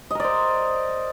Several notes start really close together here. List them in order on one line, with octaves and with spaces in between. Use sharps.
D#5 A#4 D5 C5